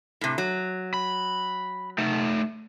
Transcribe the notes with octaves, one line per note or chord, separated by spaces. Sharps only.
A2 C3
F#3
B5
A3 D#4